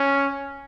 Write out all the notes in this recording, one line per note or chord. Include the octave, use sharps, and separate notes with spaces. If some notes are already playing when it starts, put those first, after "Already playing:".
Already playing: C#4